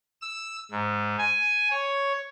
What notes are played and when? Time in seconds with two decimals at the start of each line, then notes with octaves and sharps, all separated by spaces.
0.21 E6
0.71 G#2
1.18 G#5
1.71 C#5